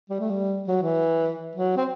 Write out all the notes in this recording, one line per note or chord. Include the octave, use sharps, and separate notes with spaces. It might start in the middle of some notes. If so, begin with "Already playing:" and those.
G3
A3
G3
F#3
E3
F#3
C4